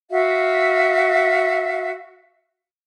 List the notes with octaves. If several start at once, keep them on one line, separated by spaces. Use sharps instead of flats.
F#4 E5 F5